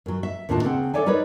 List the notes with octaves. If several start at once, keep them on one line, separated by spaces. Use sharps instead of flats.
F#2 F#3
E5
D#2 A2 D4 F4 A5
C#3 C4 F#5
A4 C#5 D5 E5 G#5
D#4 A#4 B4 C#5 D5